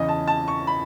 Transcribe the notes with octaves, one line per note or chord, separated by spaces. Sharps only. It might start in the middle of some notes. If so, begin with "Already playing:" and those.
Already playing: E2 C#3 E3 D#5
A5
A5
C#6
B5